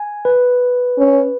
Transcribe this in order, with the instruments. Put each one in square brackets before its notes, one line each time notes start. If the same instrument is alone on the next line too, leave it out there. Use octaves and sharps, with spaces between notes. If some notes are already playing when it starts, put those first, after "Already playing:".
Already playing: [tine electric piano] G#5
B4
[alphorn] C#4